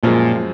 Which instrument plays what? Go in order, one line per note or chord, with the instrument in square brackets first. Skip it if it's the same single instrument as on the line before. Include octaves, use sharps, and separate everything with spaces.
[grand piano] F#2 F3 G#3 [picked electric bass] A#2